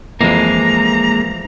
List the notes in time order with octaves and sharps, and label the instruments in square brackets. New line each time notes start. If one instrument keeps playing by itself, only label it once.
[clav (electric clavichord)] F2 E3 [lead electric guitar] G#3 A#3 [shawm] A#5